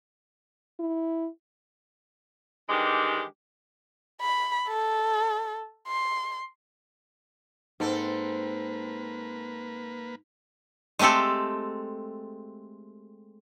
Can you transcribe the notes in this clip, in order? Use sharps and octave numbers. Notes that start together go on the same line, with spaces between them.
E4
D#3 E3 G3 G#3 D4 G4
B5
A4
C6
G#2 A#3 C4 A4 B4
G#3 A3 C4 G4 A4